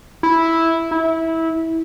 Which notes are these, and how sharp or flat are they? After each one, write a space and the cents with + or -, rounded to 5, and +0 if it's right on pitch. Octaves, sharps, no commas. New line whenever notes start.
E4 -5
E4 -20